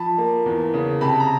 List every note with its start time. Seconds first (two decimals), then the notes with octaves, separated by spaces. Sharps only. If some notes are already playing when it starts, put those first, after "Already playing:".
Already playing: F3 A5 B5
0.18 A#3
0.46 E2
0.74 C#3
1.01 C3 A5 B5
1.20 A#5